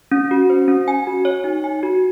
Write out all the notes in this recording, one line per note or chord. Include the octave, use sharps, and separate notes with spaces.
C#4
F#4
C5
C#4
G#5
F#4
C#5
D#4
G#5
F#4